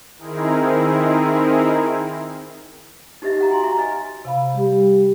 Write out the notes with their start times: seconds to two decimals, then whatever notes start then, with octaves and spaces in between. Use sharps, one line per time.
0.18 D#3 C4 D#4 E4 G#4 A#4
3.22 D#4 G4 B4 D#5 E5
3.38 G4 F#5 A#5
3.50 F#4 G#5 C6
3.63 E5 A#5 C#6
3.78 B4 D#5 F#5 G#5
4.25 C3 F5 B5
4.55 G3 G4